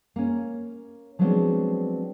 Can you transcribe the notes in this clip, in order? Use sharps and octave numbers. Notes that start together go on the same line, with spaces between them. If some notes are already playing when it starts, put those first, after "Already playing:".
A#3 C#4
F3 F#3 G#3 B3 C4 D4